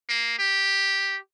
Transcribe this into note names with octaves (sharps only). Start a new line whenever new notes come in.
A#3
G4